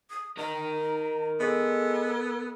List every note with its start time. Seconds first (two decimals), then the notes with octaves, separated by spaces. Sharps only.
0.10 D#6
0.37 A#4 D#5 A#5
1.40 G#3 B3 A4